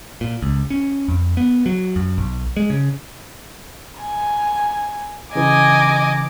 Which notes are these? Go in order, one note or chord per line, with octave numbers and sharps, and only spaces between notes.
A#2
C#2
C#4
F2
B3
F#3
F#2
B1
G#3
C#3
G#5
C#3 E3 D#5 G#5 D6